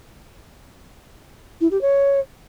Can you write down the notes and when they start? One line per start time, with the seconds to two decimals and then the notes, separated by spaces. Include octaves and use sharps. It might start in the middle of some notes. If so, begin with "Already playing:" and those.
1.61 E4
1.71 G4
1.81 C#5